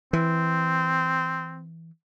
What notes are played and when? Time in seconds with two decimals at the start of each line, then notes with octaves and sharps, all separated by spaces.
0.13 E3 C4